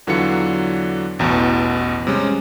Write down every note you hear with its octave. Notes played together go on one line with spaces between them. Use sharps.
E2 D3 E3 F#3 F4 C#7
A1 E2 B2
C3 G3 G#3 C#4